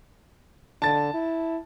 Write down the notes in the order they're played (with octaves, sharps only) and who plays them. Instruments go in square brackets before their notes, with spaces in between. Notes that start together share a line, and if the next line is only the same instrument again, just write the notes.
[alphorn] D3 [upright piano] A5 A6
[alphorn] E4